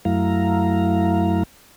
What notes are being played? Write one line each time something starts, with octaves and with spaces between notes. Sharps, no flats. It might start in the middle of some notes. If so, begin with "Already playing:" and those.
F#2 F#3 A3 E4 F5 A#5